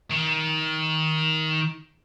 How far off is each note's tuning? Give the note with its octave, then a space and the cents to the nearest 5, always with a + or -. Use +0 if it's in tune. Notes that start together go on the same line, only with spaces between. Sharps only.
D#3 +20